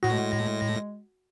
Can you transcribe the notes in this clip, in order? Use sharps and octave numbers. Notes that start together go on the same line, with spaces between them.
A2 G#3 F#4 A#6